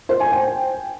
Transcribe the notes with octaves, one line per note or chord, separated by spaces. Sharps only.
C5
G#5
G5